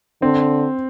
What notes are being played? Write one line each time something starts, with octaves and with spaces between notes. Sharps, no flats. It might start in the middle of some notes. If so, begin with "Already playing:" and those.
D3 C4